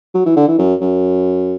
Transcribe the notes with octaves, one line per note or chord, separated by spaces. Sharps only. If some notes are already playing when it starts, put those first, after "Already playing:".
F#3
E3
D3
E3
F#2
F#2